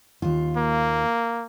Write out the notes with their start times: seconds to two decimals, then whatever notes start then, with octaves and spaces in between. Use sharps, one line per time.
0.22 D#2 F4
0.57 A#3